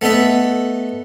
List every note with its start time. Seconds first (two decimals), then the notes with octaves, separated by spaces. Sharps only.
0.01 A3 B3 D#4 A4 B4